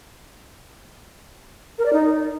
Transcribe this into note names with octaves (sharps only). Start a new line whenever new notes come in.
A#4
D5
D#4